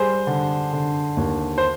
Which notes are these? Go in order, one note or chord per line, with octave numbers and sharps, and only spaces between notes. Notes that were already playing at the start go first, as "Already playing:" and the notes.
Already playing: G3 G#4 C5
D3
D3
D#2
C5